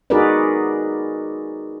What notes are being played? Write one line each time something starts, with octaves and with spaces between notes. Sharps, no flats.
D#4 F#4 G#4 A#4 B4 D5